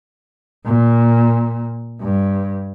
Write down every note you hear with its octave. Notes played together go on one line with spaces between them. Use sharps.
A#2
G2